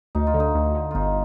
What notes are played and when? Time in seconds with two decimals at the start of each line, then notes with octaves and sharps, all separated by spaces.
0.15 D2 D#4
0.27 F4
0.34 D3
0.40 D#4
0.55 D2
0.75 D3
0.91 G1 D#4 F4